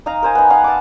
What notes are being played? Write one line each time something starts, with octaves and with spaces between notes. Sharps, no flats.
D#4 D#5 F5 A#5
A#4 C5 G#5
B3 D#4
D#5 F5 F#5
A5 D6